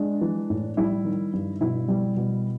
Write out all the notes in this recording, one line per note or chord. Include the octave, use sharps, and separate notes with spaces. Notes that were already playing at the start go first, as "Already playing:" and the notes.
Already playing: G#3 D4
E3
A2
G3 E4
D#3
G2
B2 E4
G3
B2